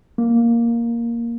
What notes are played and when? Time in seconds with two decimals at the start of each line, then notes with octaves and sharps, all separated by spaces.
0.18 A#3